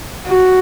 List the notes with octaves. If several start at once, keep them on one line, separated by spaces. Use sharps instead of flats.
F#4